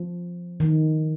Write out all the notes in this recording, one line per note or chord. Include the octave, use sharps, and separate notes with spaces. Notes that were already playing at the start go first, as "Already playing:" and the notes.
Already playing: F3
D#3